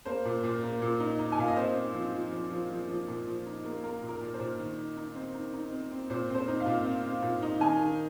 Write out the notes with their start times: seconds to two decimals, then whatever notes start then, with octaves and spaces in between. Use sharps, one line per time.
0.05 A#3 C5
0.25 A#2
0.43 A#2
0.63 A#3
0.82 A#2
1.00 D#4
1.19 D#4
1.32 G#5
1.38 A#2 F5
1.48 D#5
1.56 C4 C5
1.76 C4
1.94 F3
2.13 F3
2.32 F3
2.51 F3
2.70 F3
2.89 F3
3.08 A#2
3.27 F3
3.46 D#4
3.64 A#3
3.83 A#3 A#4
4.02 A#2
4.09 A#4
4.21 A#2
4.34 C5
4.40 A#2
4.59 D#3
4.78 D#4
4.97 D#4
5.15 C4
5.34 D#4
5.54 D#4
5.72 C4
5.91 C4
6.10 A#2 C5
6.29 C4
6.34 C5
6.48 D#4
6.60 F5
6.66 A#2
6.85 C4
7.05 C4
7.22 A#2
7.42 D#4
7.60 D#3 G#5
7.79 D#3